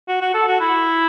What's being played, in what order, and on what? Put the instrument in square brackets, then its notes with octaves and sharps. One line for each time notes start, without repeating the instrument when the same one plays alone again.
[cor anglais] F#4
F#4
A4
F#4
E4